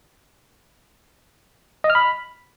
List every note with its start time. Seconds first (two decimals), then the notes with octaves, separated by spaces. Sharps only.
1.84 D#5
1.90 F6
1.95 B5